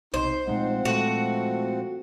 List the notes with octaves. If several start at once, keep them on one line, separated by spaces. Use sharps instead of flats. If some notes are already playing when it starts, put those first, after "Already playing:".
B1 C3 D#4 C5
A#2 F3 G#3 A3 C4 D#4 F#5
A#2 G#3 A3 F#4